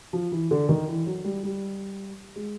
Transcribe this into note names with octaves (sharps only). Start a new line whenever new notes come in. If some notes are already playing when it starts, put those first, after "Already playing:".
F3
E3
D3
D#3
E3
F#3
G3
G3
G#3